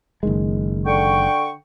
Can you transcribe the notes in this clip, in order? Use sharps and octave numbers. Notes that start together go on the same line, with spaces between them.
F#1 D#3 G#3
D3 G5 C#6